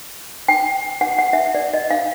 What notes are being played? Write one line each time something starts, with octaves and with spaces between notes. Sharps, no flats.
G5
F#5
F#5
E5
D5
D#5
F5